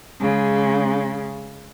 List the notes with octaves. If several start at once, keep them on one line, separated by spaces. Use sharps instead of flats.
C#3 G#3